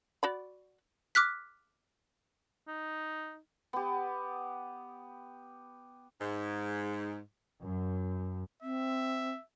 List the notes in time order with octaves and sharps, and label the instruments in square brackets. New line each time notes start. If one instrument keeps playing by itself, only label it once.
[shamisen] F#4 D5 B5
[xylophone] D6 F6 F#6 B6
[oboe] D#4
[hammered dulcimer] B3 G4
[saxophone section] G#2
[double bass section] F#2
[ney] C4 [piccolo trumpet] E5